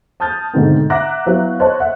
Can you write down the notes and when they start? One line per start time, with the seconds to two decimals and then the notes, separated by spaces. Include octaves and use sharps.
0.20 A5 D#6 F6 G6 A6
0.53 G#2 B2 D3 D#3 A3 C4
0.90 E5 F#5 A#5 D6 F#6 A#6
1.25 F#3 B3 E4 F5
1.60 C5 C#5 D#5 A5 F#6
1.80 E5 F#5